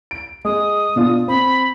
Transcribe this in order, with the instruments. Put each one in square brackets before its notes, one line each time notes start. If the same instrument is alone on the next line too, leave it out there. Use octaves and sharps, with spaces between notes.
[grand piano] D7
[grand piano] G#3 [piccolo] D#6
[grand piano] B2 D4 F4
[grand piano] C4 [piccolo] B5